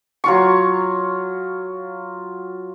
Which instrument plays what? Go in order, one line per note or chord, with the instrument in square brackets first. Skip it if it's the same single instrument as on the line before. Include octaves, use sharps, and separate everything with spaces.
[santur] F#3 F4 C#6